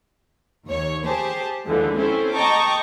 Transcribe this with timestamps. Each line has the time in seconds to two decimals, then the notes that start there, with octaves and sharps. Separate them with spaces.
0.67 D#2 C#5
1.05 G4 G#4 C5 A5
1.66 D#2 D3 E3 F3 G#3
1.97 C4 C#4 E4 A4 C5
2.35 D#5 G5 A5 A#5 C#6 D6